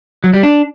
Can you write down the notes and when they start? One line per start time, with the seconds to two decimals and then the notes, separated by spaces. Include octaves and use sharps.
0.24 F#3
0.33 G3
0.43 D4